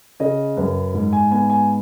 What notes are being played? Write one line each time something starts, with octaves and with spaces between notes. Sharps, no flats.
C#3 D#5
F#2 B4
G#2
G#5
B3 G#5
G#5